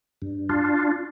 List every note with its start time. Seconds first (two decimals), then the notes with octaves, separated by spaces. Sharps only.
0.22 G2
0.49 D4 F4